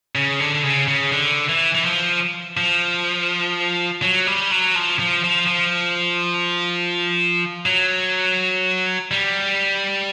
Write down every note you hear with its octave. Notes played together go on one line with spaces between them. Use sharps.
C#3
D3
C#3
C#3
D3
E3
E3
F3
F3
F#3
G3
F#3
F3
F3
F3
F3
F#3
G3